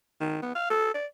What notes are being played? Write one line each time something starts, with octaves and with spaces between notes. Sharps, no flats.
D#3
B3
F5
A4
D5